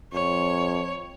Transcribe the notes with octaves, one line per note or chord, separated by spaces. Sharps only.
F2 C#5